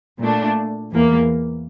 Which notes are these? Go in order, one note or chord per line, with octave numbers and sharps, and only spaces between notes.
A#2 A3 D4
E2 E3 A#3